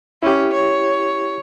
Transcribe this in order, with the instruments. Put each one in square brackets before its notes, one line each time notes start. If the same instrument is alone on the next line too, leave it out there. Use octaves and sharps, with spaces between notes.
[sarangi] C#4 [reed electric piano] E4 G4
[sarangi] C#5